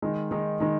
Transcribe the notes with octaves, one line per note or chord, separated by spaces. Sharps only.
D#3 G#3 D#4
D#3 G#3 D#4
D#3 G#3 D#4